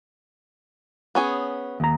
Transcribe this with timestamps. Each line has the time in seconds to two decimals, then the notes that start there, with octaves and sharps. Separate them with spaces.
1.15 B3 C#4 G#4
1.80 D#2 A#5